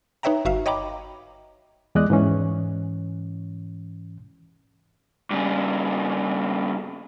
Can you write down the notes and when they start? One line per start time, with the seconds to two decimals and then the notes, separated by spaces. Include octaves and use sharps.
0.23 D#4 B4 C#5 E5 G5 A#5
0.45 G1 F#4 E5 F5
0.66 C#5 D#5 G5 A#5 B5 D6
1.95 E2 G#3 D5 D#5 F#6
2.10 G#2 E3 C#4
5.31 G2 C#3